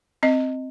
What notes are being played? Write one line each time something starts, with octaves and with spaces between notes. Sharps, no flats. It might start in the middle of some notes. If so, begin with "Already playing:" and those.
C4 D#5